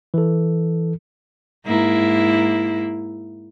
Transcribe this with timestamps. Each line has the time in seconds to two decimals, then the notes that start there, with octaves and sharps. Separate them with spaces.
0.14 E3 A4
1.67 G#2 A#3 E4